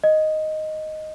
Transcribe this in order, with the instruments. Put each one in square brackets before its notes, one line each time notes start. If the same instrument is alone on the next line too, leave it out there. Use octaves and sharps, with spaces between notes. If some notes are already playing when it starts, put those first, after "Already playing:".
[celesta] D#5